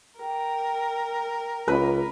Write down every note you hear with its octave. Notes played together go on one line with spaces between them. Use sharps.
A#4 G5
C#2 B4